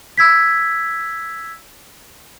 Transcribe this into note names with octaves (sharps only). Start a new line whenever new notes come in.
E6 G#6 B6